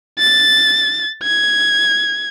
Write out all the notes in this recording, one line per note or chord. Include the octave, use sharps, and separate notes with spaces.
A6
G#6